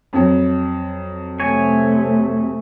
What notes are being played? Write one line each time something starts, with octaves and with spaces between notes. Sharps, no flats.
F2 F#3
C3 A3 C#5 G#5